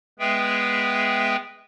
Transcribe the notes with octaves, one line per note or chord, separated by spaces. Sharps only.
G#3 B3 G#4 B4 E5 G5